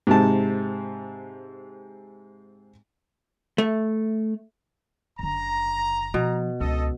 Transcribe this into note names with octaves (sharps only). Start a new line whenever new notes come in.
G#2 C3 A5
A3
F#1 D3 A#5
B2 F3
C#2 D3 A4 D#5